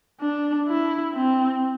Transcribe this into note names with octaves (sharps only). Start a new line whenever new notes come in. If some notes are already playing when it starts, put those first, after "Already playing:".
D4
E4
C4